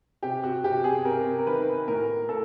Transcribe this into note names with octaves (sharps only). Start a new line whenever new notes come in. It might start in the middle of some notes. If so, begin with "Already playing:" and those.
C3 G4
F#4
C3 G4
G#4
C3 A#4
A#4
D#3 B4
A2 A#4
A2 A4